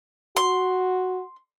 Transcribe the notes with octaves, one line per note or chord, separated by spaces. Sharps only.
F#4 C6